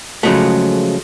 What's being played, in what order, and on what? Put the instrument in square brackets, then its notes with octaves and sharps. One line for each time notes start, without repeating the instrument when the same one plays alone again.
[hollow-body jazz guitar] C#3 F3 F#3 G#3 A3